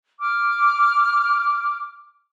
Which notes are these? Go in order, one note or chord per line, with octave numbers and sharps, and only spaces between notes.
D6 F6